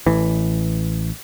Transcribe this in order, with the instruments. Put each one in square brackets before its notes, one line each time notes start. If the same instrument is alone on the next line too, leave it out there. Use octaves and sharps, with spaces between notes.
[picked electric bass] A1 E3